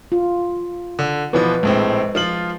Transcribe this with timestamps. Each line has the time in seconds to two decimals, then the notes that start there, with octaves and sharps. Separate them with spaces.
0.12 F4
0.99 D3
1.33 B2 E3 F3 B4
1.63 A#1 A2 G#3 C4
2.15 F3 F4 F#7